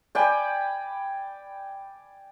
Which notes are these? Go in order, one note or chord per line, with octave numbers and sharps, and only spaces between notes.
D5 G5 G#5 B5